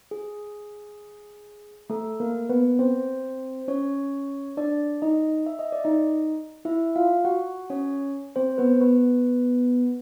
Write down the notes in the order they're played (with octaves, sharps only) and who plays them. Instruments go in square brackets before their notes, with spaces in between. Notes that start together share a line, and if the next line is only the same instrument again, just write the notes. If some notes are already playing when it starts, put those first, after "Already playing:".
[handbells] G#4
A3 A4
A#3 A#4
B3 B4
C4 C5
C#4 C#5
D4 D5
D#4 D#5
E5
D#5
D5
D#4 D#5
E4 E5
F4 F5
F#4 F#5
C#4 C#5
C4 C5
B3 B4
B3 B4